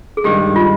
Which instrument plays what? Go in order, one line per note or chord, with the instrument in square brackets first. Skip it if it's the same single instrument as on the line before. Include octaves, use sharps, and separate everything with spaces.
[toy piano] G#4
[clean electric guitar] G2 D#3 G#3 [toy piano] G4
[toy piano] F4